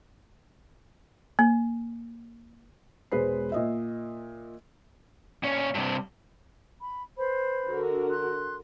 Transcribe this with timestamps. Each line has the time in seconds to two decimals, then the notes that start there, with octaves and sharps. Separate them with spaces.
1.39 A#3
3.12 E1 G#3 B4 C5 C7
3.52 A#2 D#5 E5
5.43 A#2 C#4
5.75 G2 C3
6.80 B5
7.18 B4 C5 B5
7.66 D3 F#4 A#4
8.11 C6 F#6